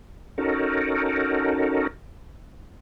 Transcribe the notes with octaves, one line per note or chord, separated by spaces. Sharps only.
C#4 D#4 F#4 A4 A#4